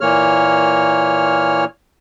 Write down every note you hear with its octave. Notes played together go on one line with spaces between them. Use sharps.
A#2 E3 A#3 C#5 F6